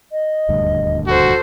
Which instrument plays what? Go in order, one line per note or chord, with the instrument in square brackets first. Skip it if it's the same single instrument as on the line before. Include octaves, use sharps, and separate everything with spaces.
[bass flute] D#5
[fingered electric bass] D#1 D2 G2
[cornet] F#4 [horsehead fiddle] A4 C5